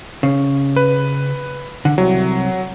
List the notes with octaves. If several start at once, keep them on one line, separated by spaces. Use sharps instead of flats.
C#3
B4
D3
C2 F#3